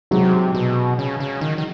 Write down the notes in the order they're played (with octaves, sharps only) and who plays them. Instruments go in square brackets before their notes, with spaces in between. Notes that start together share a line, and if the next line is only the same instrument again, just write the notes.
[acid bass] C3 [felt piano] F#3 G#3
[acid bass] B2
C#3
C#3
D#3
D#3